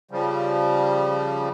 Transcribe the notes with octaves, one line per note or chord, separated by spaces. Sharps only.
C#3 F3 G3